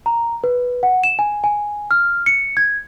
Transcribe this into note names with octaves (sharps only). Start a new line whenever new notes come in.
A#5
B4
F#5
E7
G#5
G#5
F6
C#7
G#6